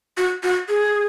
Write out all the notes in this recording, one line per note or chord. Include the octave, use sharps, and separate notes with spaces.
F#4
F#4
G#4